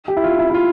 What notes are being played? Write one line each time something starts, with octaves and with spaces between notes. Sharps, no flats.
G4
E4
F4
E4
E4
F4